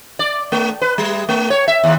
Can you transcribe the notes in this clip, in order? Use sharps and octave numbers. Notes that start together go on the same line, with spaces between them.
D5
A3
B4
G3
A3
C#5
E5
D#2